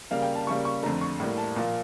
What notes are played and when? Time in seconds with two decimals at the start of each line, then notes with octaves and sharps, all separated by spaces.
0.11 C#3 G3 A#3 F5
0.22 G5
0.35 A5
0.47 C#3 G3 A#3 C#6
0.65 C#6
0.83 F2 D3 A3 A#5
1.01 C#6
1.20 A2 G3 A#3
1.38 A5
1.56 A#2 F3 A#3